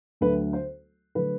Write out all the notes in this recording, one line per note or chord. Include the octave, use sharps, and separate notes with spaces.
D2 D3 F#3 A3 B4
C5
D3 F#3 A3 B4